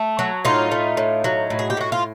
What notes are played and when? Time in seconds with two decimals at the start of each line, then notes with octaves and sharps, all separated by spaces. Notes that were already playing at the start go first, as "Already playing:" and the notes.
Already playing: A3
0.19 F#3
0.45 A2 D#4 F4
0.71 A3
0.97 A2
1.24 F#3
1.50 A2
1.59 G#4
1.70 G4
1.77 A2 F#4
1.92 F4